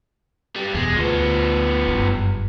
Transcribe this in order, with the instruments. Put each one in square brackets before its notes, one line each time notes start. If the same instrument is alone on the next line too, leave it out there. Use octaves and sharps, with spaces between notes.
[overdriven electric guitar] G2 G3
[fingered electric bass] E2 B2 [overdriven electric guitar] G#3
[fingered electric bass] D2 [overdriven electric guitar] F3 B3
[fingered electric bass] F#1 G2